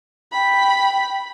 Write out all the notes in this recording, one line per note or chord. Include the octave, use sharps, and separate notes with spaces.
G5 B5